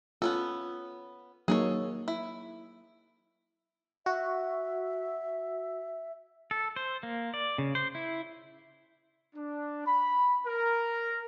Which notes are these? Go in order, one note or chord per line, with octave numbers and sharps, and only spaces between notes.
B3 C#4 F4 A4
F#3 A#3 D#4 G#4 A4 C#5
E4
F#4 E5
A4
C5
A#3
D5
C#3
C5
E4
D4
B5
A#4